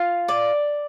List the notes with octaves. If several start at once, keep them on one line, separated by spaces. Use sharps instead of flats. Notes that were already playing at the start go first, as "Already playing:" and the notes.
Already playing: F4
D5